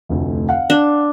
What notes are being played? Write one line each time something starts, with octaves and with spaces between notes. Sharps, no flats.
F1 D2
F5 F#5
D4